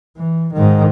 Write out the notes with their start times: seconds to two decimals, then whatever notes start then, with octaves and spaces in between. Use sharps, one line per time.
0.18 E3
0.54 G#2 D#3